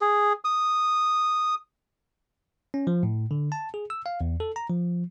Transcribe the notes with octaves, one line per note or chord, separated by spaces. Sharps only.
G#4
D#6
C#4
F3
A2
D3
A5
G#4
E6
F5
E2
A4
A#5
F3